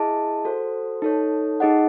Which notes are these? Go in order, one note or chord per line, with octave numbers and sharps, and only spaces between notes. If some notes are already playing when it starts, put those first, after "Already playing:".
Already playing: E4 G#4 D#5 A5
F#4 A4 C5
D#4 A4 C#5
D#4 G#4 D#5 F#5